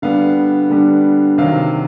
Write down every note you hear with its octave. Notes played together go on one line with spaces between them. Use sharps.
D3 G3 B3 F5
D3 G3 B3
C3 D#3 F#3 F5